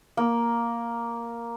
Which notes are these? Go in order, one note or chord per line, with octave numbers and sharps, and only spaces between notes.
A#3